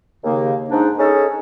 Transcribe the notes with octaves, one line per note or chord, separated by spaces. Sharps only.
D#2 C#3 A#3
G#2 D4 D#4
C#4 D#4 G#4 A4